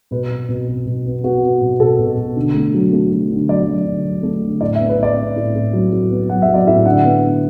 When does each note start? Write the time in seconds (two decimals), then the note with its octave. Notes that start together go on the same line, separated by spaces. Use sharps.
0.11 B2 B4
0.31 B2
0.49 B2
0.67 B2
0.86 B2
1.05 B3
1.24 B3 F#4
1.43 B3
1.61 B2
1.80 B2 A4
1.99 B2
2.17 B2
2.36 D3
2.54 A3
2.74 F#3
2.93 A3
3.11 F#3
3.30 D3
3.48 F#3 D5
3.67 F#3
3.86 D3
4.05 F#3
4.23 A3
4.42 D3
4.61 A2 D5
4.75 E5
4.80 B3
4.89 B4
4.98 A2 D5
5.17 B3
5.36 A2
5.55 A2
5.73 F#3
5.92 A2
6.11 B3
6.29 F#3 F#5
6.42 E5
6.48 F#3
6.54 D5
6.67 A2 E5
6.86 D3 F#5
7.04 B3
7.23 D3